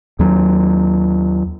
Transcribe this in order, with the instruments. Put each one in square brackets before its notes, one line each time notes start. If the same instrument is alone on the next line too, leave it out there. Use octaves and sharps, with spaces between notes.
[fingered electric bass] D#2 F#3